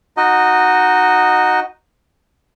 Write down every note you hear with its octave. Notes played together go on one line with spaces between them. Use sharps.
D#4 F#4 D#5